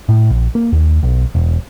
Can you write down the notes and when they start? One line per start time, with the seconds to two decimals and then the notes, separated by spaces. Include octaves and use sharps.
0.09 A2
0.30 A#1
0.55 A#3
0.72 D#2
1.03 B1
1.35 E1